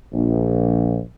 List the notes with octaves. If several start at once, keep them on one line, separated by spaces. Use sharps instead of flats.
A#1